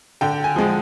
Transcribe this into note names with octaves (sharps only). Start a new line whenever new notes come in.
D3 G5
G#5
F3 G#3